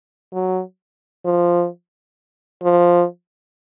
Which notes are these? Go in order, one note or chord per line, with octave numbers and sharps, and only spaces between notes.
F#3
F3
F3